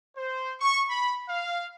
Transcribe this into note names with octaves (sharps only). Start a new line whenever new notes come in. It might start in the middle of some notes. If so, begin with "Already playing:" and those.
C5
C#6
B5
F5